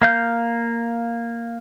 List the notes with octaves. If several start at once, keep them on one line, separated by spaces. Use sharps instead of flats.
A#3 F5 G6